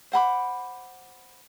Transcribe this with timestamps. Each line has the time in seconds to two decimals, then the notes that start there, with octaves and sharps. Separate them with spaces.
0.12 C5 F#5 B5 D6